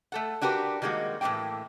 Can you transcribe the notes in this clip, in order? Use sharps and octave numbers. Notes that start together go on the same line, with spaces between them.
A3 A4 F#5
D4 F#4 G4 A#4 B4
D#3 G3 G#3 A#3 F#4
A2 E3 A3 A#3 G5